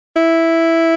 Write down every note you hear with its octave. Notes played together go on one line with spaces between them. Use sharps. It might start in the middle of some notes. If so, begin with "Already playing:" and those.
E4